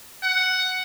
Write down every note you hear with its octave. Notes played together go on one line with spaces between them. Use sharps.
F#5